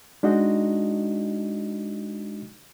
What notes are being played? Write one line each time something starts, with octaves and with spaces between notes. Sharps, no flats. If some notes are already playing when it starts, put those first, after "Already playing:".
G#3 D4 D#4 F#4 D#5